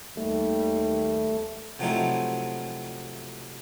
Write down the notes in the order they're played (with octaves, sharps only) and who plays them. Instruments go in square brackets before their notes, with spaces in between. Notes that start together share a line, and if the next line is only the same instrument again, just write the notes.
[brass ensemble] D#2 G3 [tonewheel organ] A3
[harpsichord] C3 F3 F#3 A3 D#4 E4